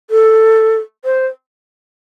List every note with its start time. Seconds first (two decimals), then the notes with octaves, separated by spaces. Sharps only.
0.10 A4
1.05 C5